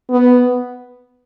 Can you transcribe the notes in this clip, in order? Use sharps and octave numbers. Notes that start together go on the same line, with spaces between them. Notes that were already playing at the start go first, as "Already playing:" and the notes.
B3